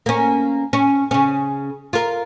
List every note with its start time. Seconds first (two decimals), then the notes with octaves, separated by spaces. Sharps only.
0.06 A#3 C#4
0.73 C#4
1.11 C#3 C#4
1.93 F4 A#4